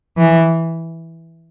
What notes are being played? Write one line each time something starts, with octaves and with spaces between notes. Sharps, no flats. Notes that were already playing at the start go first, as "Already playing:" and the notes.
E3